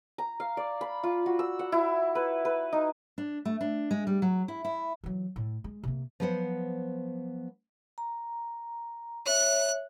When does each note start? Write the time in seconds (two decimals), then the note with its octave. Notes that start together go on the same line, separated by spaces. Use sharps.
0.18 A#5
0.40 F5
0.57 D5
0.81 B5
1.03 F4
1.26 F#4
1.39 E6
1.59 F#5
1.72 E4
2.15 B4
2.45 B4
2.73 D#4
3.18 D4
3.45 A3
3.61 D4
3.91 G#3
4.07 G3
4.22 F#3
4.48 E4
4.65 E4
5.04 E3 F#3
5.36 A2
5.64 G#3
5.83 C3 A#3
6.20 F3 F#3 B3 C5 F#5
7.98 A#5
9.26 C#5 E5 F#6